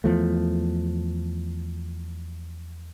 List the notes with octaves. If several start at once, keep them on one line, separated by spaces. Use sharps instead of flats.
E2 F3 A3